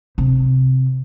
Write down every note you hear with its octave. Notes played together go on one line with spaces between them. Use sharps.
C3